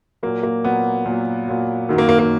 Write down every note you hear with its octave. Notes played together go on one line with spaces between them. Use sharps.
A#2 F#3 A#3
A#3
A#2 F#3 B3
A#2 F#3
A#2 F#3
F#2 D#3 F#3
A#3
A#3
A#3